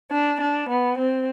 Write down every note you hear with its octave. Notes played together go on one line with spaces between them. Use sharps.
D4
D4
B3
C4